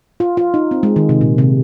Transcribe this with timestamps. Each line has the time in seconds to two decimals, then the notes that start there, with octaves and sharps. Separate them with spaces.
0.20 F4
0.37 F4
0.54 D#4
0.71 C4
0.83 G#3
0.96 D#3
1.09 C3
1.21 A#2
1.38 C3